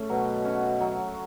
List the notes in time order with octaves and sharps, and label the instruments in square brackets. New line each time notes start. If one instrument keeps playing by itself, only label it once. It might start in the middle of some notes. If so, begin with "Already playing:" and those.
Already playing: [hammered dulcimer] A3 C#4
[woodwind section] B2 [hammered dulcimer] F#3
[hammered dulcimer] C#4 F#4
F#3